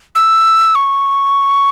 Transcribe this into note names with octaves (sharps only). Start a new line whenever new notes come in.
E6
C#6